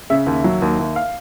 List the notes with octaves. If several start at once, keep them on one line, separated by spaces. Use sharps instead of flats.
C#3 E5
D#2
F#3
D#2
D#2
F5